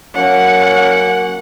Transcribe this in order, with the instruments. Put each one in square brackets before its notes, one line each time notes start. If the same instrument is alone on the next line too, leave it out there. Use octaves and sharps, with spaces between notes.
[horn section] F#3 A#3 C#4 [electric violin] F#5